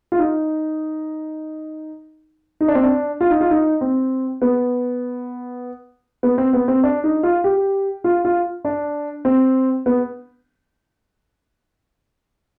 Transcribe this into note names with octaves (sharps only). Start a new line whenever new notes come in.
F4
D#4
D#4
D4
C4
D4
F4
D#4
F4
D#4
C4
B3
B3
C4
B3
C4
D4
D#4
F4
G4
F4
F4
D4
C4
B3